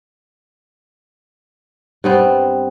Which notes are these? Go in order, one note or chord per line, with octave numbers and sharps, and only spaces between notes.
G2 B3 C4